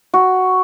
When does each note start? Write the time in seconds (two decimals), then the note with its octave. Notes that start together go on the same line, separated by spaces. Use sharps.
0.14 F#4